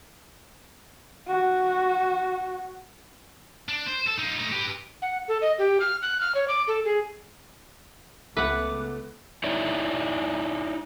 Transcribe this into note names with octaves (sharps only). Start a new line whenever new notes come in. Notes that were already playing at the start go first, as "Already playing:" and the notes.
F#4
D4
C5
A4
D#4 F4
A3 D#4
G4 B4
F#5
A4
D#5
G4
F6
F#6
F6
C#5
D6
A4
G#4
C#2 A3 B3 B4 F#5 D6
D#4 E4 C#5 D5 E5